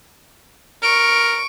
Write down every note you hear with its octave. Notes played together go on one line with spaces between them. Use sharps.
A#4 C#6 D7